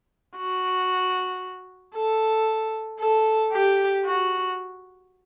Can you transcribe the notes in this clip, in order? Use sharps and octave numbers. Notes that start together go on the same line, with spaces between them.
F#4
A4
A4
G4
F#4